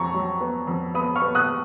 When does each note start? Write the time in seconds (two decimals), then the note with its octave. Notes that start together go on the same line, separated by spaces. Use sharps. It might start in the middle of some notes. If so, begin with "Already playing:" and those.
Already playing: F2 A#5 C#6
0.14 F#3
0.41 B3
0.67 F2
0.94 B3 B5 D#6
1.16 C#6 F6
1.22 B3
1.35 D#6 F#6